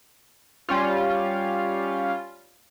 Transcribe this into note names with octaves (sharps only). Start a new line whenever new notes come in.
G3 C#4 F4